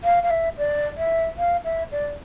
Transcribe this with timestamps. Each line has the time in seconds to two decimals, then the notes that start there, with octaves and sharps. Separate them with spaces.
0.04 F5
0.23 F5
0.30 E5
0.58 D5
0.97 E5
1.38 F5
1.65 E5
1.92 D5